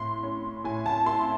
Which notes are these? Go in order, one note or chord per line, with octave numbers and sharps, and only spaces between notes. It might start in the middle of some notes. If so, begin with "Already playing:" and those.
Already playing: A2 C6
C#4
A2 G#5
A5
E4 C6